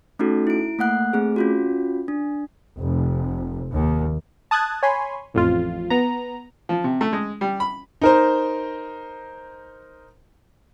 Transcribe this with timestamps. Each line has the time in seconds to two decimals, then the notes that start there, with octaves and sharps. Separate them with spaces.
0.19 A3 C#4 D#4 F#4 A4
0.47 E4 D7
0.79 A3 A#3 F#5 F#6
1.13 A3 C4 G#4
1.36 C#4 F4 F#4
2.08 D4
2.79 F1
3.73 D#2
4.51 A5 D#6 F#6 G#6 A6
4.83 C#5 G#5 B5 C6
5.34 A1 F2 F4
5.90 B3 A#5
6.69 F3
6.84 C3
7.01 A3
7.13 G#3
7.41 G3
7.60 B5
8.02 D#4 A#4 C5